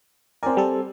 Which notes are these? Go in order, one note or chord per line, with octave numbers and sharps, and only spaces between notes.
C4 A#4 D5 G#5
G3 A4